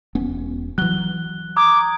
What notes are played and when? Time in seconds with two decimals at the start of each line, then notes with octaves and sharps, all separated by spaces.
0.15 E1 B3 C#4
0.78 E3 F#3 F#6 G7
1.57 A#5 D6 D#6 G#6